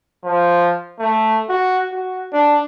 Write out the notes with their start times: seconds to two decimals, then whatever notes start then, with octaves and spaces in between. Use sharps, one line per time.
0.24 F3
0.99 A3
1.49 F#4
1.92 F#4
2.33 D4